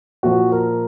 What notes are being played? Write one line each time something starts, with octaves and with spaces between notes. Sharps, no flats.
A#2 F3 F#4
A#4